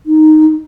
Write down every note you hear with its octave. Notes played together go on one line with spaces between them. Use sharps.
D#4